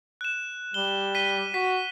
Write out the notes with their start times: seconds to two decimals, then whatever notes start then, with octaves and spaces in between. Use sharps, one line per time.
0.21 F#6 E7
0.74 G3 G7
1.15 B6 D#7 G7
1.54 F#4 B6